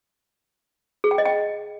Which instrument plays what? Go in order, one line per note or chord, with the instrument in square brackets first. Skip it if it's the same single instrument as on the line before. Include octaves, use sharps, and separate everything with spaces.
[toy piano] G#4
G5
D#5
G5